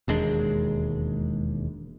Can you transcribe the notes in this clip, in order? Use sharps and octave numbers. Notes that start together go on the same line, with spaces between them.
E1 D#2 G#3 D4